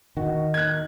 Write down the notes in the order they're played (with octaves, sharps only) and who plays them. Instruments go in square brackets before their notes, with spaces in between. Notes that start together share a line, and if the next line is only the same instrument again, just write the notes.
[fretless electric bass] D#3 [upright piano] F#4
[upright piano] F#6 G#6